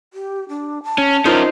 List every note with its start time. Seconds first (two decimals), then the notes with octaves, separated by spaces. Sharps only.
0.13 G4
0.49 D4
0.84 A5
0.98 C#4
1.25 C#4 D#4 F4 A#4 C5